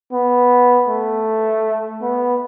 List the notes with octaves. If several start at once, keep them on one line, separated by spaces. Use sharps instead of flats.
B3
A3
B3